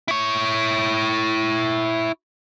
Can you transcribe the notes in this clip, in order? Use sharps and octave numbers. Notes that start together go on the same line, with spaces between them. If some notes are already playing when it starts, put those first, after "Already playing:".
E4 C#5